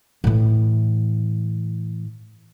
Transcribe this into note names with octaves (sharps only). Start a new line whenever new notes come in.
A2 E3